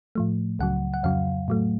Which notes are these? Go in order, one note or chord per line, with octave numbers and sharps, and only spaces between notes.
A2 F3 A3
C#2 C#3 F#3 F#5
F#5
F2 C#3 F#3 F5
A2 F#3 A3